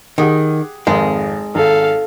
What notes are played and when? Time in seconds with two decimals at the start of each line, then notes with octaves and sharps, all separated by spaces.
0.18 D#3 G4 G#4 F#5
0.87 G#1 F2 G#3 A#4
1.55 G#1 A4 F5